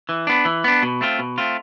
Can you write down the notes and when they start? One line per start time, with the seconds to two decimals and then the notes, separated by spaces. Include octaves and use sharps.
0.09 E3
0.27 B3 D4
0.45 E3
0.64 B3 D4
0.83 B2
1.01 A3 C4 F4
1.19 B2
1.38 A3 C4 F4